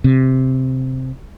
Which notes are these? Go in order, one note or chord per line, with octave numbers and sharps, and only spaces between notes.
C3